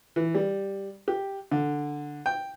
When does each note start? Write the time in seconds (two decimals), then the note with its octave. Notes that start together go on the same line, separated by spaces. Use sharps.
0.16 E3
0.35 G3
1.08 G4
1.51 D3
2.26 G5